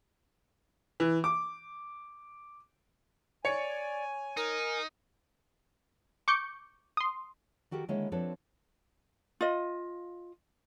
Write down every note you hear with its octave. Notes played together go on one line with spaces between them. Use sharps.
E3
D6
C#5 D5 G#5 C#7
D#4 A#4
C#6 D6 G6 C#7
C6 D#6
D#3 F#4 G4 A4 A#4
D3 D#3 G#3 A#3 E4 C#5
F3 C4 D4 A4 B4 C#5
F4 D#5